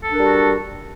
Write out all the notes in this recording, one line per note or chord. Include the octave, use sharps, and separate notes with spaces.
G3 D4 F#4 A4 A#4